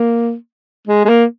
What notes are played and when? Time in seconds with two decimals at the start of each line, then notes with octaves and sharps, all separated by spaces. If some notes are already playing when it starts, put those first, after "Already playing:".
Already playing: A#3
0.87 G#3
1.05 G#3
1.09 A#3